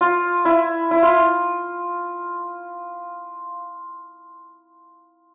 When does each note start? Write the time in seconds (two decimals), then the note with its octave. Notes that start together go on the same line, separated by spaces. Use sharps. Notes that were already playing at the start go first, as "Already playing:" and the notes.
0.01 F4
0.45 E4
0.91 E4
1.02 F4